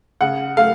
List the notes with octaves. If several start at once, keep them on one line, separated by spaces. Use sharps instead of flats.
C#3 F#5
A3 F5